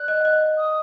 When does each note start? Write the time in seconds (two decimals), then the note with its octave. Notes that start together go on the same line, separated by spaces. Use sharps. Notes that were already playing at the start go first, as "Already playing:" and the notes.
Already playing: D5 F#6
0.08 D#5
0.20 F#5
0.25 D#5
0.57 D#6